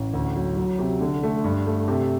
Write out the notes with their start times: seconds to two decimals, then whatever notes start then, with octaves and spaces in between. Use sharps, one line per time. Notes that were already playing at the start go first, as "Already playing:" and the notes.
Already playing: A1
0.14 D2
0.36 F#3
0.57 F#3
0.79 C3
1.01 D3
1.23 A3
1.44 G2
1.67 A3
1.88 C3